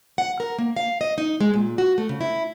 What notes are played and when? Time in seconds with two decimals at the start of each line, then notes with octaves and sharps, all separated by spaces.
0.18 F#5
0.40 A#4
0.58 A#3
0.76 F5
1.01 D#5
1.18 D#4
1.41 G#3
1.54 A#2
1.78 F#4
1.98 A3
2.09 C#3
2.21 E4